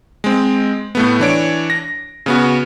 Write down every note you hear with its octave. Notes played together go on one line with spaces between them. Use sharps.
G#3 C4
A2 A3 B3
E3 D4 C#5 D7
A#6
C#3 B3 F#4